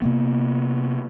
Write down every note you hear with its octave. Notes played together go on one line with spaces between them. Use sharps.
C3 A#3 B3